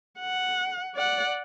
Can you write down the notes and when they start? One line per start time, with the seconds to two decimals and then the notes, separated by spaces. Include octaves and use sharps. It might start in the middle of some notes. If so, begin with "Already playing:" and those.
0.19 F#5
0.95 D5 F#5